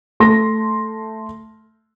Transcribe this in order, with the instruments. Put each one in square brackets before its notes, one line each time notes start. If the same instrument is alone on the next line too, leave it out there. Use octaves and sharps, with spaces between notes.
[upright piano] A3 C6 A#6